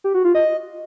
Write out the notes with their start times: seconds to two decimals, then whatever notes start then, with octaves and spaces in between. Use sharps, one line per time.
0.04 G4
0.14 F#4
0.25 F4
0.35 D#5